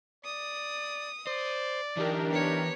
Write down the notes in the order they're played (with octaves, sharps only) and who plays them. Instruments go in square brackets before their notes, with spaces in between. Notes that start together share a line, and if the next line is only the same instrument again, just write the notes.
[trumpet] D5 [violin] D#6
[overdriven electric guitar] C5 [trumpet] D5
[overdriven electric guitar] E3 D#4 [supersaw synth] D4 G4 A#4
[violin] B3 C#5 [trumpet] A#5